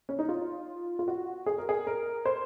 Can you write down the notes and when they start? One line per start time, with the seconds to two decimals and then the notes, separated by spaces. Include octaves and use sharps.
0.09 C#4
0.19 D#4
0.29 F4
0.99 F4
1.08 F#4
1.46 G#4
1.58 A#4
1.69 G#4
1.87 A#4
2.26 C5